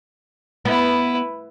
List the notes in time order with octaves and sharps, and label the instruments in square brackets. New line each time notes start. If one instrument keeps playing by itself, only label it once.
[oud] B3 [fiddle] E4 B4